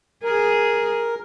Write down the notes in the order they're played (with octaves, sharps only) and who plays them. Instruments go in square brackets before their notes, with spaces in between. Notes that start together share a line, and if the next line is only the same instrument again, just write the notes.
[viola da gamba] G#4 [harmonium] A#4